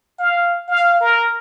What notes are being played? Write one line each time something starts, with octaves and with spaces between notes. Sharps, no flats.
F5
F5
A#4